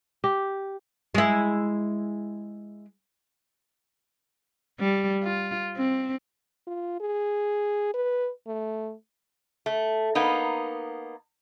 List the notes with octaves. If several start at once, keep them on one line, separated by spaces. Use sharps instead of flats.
G4
G#3 E4
G3
F4
C4
F4
G#4
B4
A3
A3
A#3 B3 D#4